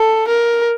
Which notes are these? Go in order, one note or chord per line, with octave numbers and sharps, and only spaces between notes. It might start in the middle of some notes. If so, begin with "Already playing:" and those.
Already playing: A4
A#4